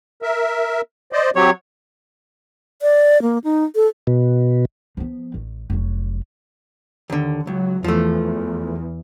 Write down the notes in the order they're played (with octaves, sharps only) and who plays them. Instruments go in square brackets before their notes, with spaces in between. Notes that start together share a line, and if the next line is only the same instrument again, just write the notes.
[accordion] A#4 E5
C5 D5 D#5
[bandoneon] F#3 C#5 [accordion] C4 G4
[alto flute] D5
A#3
D#4
A4
[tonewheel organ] B2
[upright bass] F3 B3
A1
F1 F#3
[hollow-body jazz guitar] D#2 D3
[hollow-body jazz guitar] C#2 [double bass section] F#3
[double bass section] E2 [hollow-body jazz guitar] F3 A3